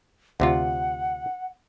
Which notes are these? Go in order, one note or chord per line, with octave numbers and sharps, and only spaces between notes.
D2 C3 F4 F#5